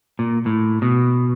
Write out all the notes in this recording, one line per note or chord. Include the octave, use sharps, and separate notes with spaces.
A#2
A2
B2